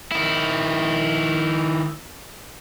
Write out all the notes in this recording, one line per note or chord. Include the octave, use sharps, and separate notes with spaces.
D#3 E4